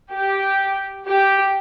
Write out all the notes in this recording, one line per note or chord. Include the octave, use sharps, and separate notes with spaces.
G4
G4